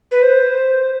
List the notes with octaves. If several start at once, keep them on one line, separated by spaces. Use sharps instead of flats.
B4
C5